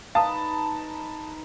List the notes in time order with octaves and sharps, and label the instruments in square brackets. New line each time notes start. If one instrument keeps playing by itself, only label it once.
[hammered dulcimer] D#4 B4 D#5 [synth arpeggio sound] F5 D#6 [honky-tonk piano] A5